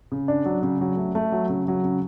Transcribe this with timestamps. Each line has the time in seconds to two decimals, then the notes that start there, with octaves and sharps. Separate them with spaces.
0.12 C#3
0.28 D4
0.45 F#3
0.63 C#3
0.81 F#3
0.97 A3
1.15 A3
1.32 F#3
1.49 C#3
1.68 F#3
1.84 C#3